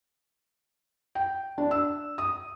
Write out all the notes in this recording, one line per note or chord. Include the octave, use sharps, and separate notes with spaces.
G5
D4
E6
D#6